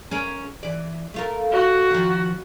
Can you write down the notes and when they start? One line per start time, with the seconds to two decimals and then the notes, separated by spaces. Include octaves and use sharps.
0.11 C#4 G#4 A#4
0.63 E3 D5
1.14 A3 F4 A#4
1.52 F#4
1.91 D#3 F3